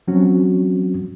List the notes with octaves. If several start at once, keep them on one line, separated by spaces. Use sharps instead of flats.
F3 F#3 C4 C#4 F#4